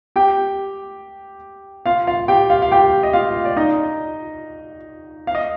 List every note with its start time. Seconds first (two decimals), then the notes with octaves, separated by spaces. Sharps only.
0.16 G4 G5
1.86 F4 F5
2.07 F4 F5
2.28 G4 G5
2.50 F4 F5
2.62 F5
2.72 G4 G5
3.03 D#5
3.13 F4 F5
3.45 D5
3.56 D#4 D#5
5.27 F5
5.35 D#5